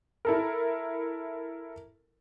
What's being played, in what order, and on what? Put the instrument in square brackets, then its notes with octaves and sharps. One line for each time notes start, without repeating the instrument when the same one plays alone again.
[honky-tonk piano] E4 A4 A#4